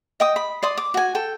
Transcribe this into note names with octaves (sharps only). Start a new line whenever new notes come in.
D#5 G5 D#6
B5
D5 C6 D#6
D6
F#4 G#5
A4 G5